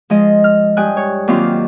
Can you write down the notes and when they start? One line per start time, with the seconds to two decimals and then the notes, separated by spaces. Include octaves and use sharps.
0.10 F3 G#3 D#5
0.44 F6
0.77 G2 G5 G#5 D#6 F#6
0.97 C#5
1.28 D#2 F#3 C4 F4 D6